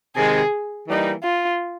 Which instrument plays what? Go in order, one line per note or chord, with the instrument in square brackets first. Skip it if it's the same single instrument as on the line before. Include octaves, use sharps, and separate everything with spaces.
[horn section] C3 D#3 G#3 [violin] G#4
[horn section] E3 G3 A#3 D#4
[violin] F4